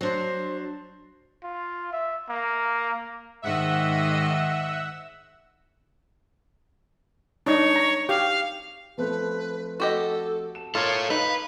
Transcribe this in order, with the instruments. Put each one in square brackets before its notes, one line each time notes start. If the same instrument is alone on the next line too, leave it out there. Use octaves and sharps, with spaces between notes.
[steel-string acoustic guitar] F#3 D4 [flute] C5
[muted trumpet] F4
E5
A#3
[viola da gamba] G#2 D#3 D#5 [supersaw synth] E5 F#5 E6
[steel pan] D4 D#4 [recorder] C#5
[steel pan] A#5
[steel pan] G4 [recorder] F5
[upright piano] F3 A3 C4 [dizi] B4
[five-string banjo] F#4 G4 D#5 [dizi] A4
[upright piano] A5 E7
[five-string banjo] F4 [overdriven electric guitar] A4 C#5 [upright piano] A#4 A#5 D6 [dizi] F5
[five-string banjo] D#4 [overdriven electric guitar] B4